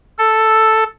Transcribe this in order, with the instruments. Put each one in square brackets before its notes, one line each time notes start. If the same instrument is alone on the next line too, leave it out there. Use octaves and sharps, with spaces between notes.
[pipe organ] A4